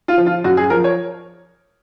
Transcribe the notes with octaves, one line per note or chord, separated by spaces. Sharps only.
F4
F3
F4
F#2 F#4
G#4
F3 A#4
C#5